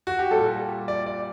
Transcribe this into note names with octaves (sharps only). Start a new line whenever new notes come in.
F#4
G4
A#2 G3 A4
D5
D5